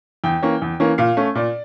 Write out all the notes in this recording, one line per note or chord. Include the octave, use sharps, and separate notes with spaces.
E2 G5
E3 A#3 C#4
E2
E3 A#3 C#4
A#2 F5
A3 C#4
A#2 D5